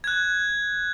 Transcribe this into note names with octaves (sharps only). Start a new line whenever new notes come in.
F#6 G#6